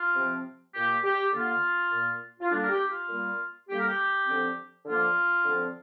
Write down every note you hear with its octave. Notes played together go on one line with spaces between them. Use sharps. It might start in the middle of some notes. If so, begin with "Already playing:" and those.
Already playing: F4
C3 F3 C4
A#2 A#3 G4
G4
D3 A#3 F4
A#2 A#3
F4
D3 G3 A#3 D4
A#4
G4
F4
A#2 G3 A#3
D3 G3 A#3 G4
A#4
G4
D3 F3 C4
D3 F3 A#3 F4
D3 F3 C4